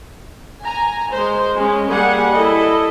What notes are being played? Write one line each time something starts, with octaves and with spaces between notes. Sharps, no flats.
G#5 A#5
G#3 C5
G#3 C#4
G3 A#3 G4 G#4 F#5
E4 A4 D#5